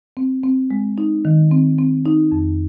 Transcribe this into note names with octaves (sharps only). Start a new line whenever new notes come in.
C4
C4
G#3
D#4
D#3
C4
C4
D#4
F2